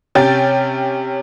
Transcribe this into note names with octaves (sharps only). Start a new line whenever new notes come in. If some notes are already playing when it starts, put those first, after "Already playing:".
C3 C#4 G5 A6